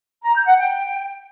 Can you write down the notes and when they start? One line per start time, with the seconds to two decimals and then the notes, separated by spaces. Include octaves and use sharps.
0.23 A#5
0.35 G6
0.46 F#5
0.57 G5